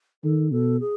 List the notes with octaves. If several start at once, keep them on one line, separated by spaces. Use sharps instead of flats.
D#3 A4
B2 A4
G#4